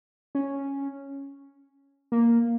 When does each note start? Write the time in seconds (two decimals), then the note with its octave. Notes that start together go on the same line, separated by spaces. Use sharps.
0.35 C#4
2.12 A#3